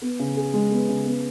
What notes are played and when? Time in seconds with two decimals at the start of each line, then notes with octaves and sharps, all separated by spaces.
0.02 B3
0.19 C#3
0.37 G#4
0.54 G#3
0.71 B3
0.89 C#3
1.06 B3